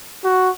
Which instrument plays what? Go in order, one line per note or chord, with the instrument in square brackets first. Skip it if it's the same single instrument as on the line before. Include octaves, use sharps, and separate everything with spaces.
[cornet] F#4